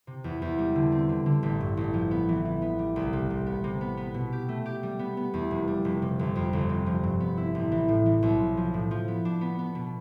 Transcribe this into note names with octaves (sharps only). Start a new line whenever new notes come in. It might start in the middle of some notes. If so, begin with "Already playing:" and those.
C3
E2
E2
G3
D3
C4
D3
D3
A1
G2
A1
F3
B3
E3
E3
B3
G3
C2
C3
C3
B3
C3
B3
B3
B2
G4
A3
G4
G3
B3
B3
E2
F1
G3
F1
C3
G1
F2
G1
C3
F3
G2
B3
E4
A1
E3
A2
E3
B1
F3
F3
A2
F3
B3
D4
B3
B3
B2